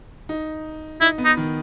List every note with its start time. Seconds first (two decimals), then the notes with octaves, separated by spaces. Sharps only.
0.29 D#4
1.01 D#4 E4
1.18 B3
1.25 D#4
1.37 D#3